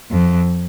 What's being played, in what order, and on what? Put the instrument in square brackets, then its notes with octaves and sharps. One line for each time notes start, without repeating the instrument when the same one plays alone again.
[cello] F2